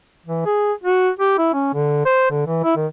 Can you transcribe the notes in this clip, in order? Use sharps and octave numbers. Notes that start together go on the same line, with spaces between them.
E3
G#4
F#4
G4
E4
C#4
D3
C5
D3
E3
E4
D#3